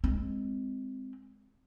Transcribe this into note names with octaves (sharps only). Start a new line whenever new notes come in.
G#3 C4